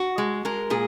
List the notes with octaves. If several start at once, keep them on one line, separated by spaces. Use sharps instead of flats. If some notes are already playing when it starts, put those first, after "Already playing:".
Already playing: F#4
G#3
G#3 A#4
A#2 G#4